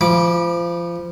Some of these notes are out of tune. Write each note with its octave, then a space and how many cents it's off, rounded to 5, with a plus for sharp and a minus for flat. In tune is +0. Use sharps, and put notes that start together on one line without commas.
F3 -25 B5 -25 D6 +0